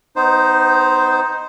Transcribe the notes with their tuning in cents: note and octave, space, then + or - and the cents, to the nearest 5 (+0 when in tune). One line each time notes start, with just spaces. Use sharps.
B3 +35 D#4 +0 C5 +0